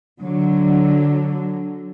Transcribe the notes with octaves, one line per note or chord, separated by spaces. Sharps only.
D3 F#3